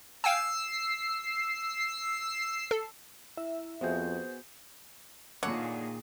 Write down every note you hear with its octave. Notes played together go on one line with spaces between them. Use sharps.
F5 G5 G#5 E6 C7
A4
E4 E5
F2 B3 F#4 G#4 C5 G6
A#2 D3 D#3 G#4 C#5 F#5